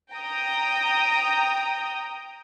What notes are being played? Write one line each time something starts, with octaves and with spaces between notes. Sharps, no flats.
G5 A#5 D#6